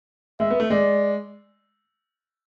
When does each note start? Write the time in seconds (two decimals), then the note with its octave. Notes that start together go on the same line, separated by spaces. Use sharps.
0.40 G#3 E5
0.50 B3
0.60 A3
0.70 G#3 D5